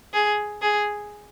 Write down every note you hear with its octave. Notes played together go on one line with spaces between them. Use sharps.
G#4
G#4